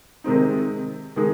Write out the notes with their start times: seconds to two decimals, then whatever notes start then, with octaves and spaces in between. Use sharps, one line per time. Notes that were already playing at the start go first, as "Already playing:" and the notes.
0.24 C3 D#3 G#3 C4 D#4
1.16 D#3 G#3 D#4 G#4